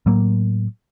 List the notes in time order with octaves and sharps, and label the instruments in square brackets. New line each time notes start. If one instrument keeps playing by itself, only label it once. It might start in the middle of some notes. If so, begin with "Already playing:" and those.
[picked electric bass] A2 F#3 A#3